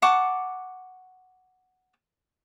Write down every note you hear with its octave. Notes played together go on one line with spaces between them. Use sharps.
F#5 A5 C#6 D6